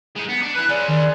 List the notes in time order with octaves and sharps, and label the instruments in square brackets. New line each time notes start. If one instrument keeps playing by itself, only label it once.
[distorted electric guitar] G#3 D#4
B3
D4
[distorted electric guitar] E4 B4 [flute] F#6
[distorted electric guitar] G#3 C#4 [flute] D5
[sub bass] D#3 [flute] D5